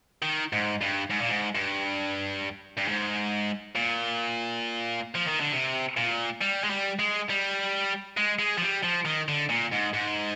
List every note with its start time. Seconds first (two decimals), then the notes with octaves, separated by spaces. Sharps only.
0.22 D#3
0.53 G#2
0.81 G2
1.10 G#2
1.21 A#2
1.30 G#2
1.55 G2
2.78 G2
2.88 G#2
3.76 A#2
5.15 F3
5.28 D#3
5.41 D3
5.53 C3
5.97 A#2
6.41 G3
6.64 G#3
6.70 G3
6.99 G#3
7.30 G3
8.17 G#3
8.39 G#3
8.57 F3
8.62 G3
8.83 F3
9.05 D#3
9.28 D3
9.50 A#2
9.72 G#2
9.94 G#2